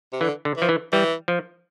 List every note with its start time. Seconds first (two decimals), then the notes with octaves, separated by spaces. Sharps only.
0.13 C3
0.21 D3 E3
0.45 D3
0.57 E3 F3
0.69 E3
0.92 E3 G3
1.28 F3